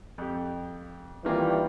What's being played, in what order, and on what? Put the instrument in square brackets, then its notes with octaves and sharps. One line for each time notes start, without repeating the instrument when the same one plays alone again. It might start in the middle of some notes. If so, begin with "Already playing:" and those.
[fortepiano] F2 G4
[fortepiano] D#3 A#3 F4 [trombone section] E3 G3